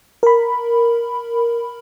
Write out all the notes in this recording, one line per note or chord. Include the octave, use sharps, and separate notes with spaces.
A#4 B5